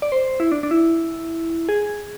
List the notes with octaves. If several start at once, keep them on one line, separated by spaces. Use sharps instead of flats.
D5
C5
E4
D4
D4
E4
G#4